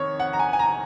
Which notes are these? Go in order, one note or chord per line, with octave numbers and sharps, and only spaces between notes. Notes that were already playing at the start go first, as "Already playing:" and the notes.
Already playing: F2 D#3 C#5
F#5
A#5
G#5
G#5
A#5